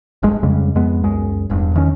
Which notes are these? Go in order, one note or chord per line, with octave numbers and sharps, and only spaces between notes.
D#1 G2 G#3
F2 C#3 G3 G#3
F2 G#3 B3
C#2 F#2 G#3
D#1 E2 G2
E2 D#3 C#4